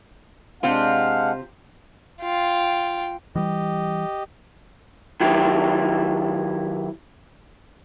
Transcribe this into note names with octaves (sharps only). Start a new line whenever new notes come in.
C3 G#3 C4 D4 F4 F5 F#5
F4 G5
E3 G3 G4 D#5
D#3 F#3 E4 G4